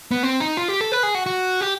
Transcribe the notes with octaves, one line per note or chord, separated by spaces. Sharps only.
B3
C4
D#4
F4
G4
A4
B4
G#4
F#4
F#4
G4